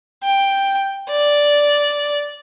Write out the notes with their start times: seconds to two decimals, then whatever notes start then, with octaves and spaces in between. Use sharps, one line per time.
0.23 G5
1.10 D5